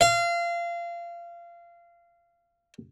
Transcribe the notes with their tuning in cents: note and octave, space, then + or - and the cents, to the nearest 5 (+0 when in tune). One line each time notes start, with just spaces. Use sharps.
F5 -25